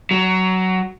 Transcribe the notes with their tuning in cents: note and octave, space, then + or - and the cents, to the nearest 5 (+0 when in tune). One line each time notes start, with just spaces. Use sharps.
F#3 +15